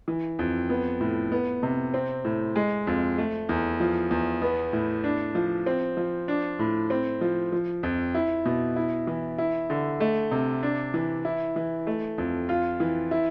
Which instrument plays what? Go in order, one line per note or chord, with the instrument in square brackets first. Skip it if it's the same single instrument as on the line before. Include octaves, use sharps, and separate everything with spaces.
[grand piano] E3
F2
B3
A2
B3
C3
C4
A2
G#3
F2
A3
E2
F3
E2
B3
A2
D4
F3
C4
F3
D4
A2
C4
F3
F3
F2
E4
B2
E4
E3
E4
D3
A3
C3
D4
E3
E4
E3
A3
F2
F4
E3
E4